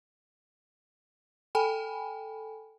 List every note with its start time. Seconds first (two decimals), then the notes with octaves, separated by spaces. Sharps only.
1.55 A4 G5 G#5 B5